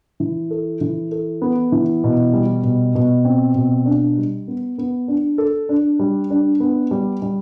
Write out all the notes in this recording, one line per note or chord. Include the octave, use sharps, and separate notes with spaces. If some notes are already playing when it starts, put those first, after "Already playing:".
E3
A4
E3
A4
B3
E3
B2
G3
B2
B2
C4
B2
D4
G3
B3
B3
D4
A4
D4
G3
D4
B3
G3
G3